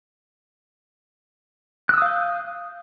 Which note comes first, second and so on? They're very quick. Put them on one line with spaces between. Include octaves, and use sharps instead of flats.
F#6 E6 D#6 F5 G6